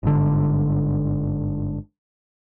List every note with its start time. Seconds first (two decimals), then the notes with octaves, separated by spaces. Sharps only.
0.03 G1 G#2 D3